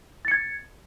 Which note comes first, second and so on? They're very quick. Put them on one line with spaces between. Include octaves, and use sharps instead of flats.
A6 C#7 G#6